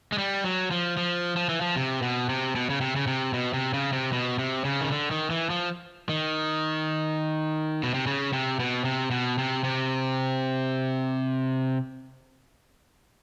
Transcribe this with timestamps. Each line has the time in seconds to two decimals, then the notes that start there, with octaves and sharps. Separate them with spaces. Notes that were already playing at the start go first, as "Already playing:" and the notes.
0.12 G#3
0.18 G3
0.44 F#3
0.71 F3
0.97 F3
1.36 F3
1.49 E3
1.61 F3
1.76 C3
2.02 B2
2.29 C3
2.56 B2
2.70 C#3
2.81 C3
2.96 C#3
3.07 C3
3.34 B2
3.54 C3
3.74 C#3
3.93 C3
4.13 B2
4.39 C3
4.65 C#3
4.81 D#3
4.92 D3
5.11 D#3
5.30 E3
5.50 F3
6.09 D#3
7.83 B2
7.94 C3
8.07 C#3
8.33 C3
8.60 B2
8.85 C3
9.11 B2
9.38 C3
9.64 C3